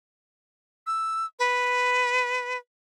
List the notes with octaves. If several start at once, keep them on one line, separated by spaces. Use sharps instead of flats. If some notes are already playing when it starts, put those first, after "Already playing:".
E6
B4